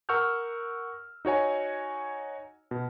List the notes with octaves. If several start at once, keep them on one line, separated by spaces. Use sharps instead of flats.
A#4 F#5 C#6 E6 F6 G6
D#4 F#4 C#5 G#5
B2